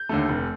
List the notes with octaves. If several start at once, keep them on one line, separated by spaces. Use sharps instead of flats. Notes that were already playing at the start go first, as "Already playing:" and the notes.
Already playing: G6
D#2 D3 A3
F1